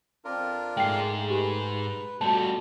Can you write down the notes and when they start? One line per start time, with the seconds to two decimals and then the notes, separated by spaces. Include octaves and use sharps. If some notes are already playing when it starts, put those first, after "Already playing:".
0.25 F2 C4 D4 F4 A#4
0.77 G#2 G#3 A3 G#4 G5 C7
1.30 G4 B4
2.21 F2 G3 A3 F#4 C5 A5